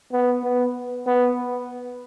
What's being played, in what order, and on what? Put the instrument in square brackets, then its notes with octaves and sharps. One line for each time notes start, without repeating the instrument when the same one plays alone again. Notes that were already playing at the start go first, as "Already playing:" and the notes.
[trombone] B3
B3
B3